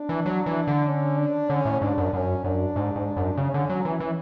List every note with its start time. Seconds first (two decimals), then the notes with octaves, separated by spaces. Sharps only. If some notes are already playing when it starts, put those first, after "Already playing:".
Already playing: D4
0.09 E3
0.26 F#3
0.46 E3
0.67 D3
0.88 C#4
1.19 D4
1.50 D3 C#4
1.65 A2
1.81 G#2 D4
1.98 F#2
2.13 F#2 C#4
2.44 F#2 D4
2.76 G#2
2.96 G#2
3.16 F#2
3.37 C#3 C#4
3.54 D3
3.70 F#3
3.85 E3
4.00 E3